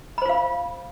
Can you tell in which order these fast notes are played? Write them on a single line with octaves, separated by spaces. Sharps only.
B5 C5 F4 F5